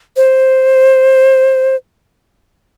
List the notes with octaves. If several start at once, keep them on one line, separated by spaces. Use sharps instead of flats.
C5